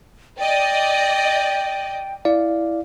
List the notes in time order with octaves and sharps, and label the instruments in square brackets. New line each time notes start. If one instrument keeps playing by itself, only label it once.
[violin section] D5 D#5 [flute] G5
[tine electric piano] E4 D5 F5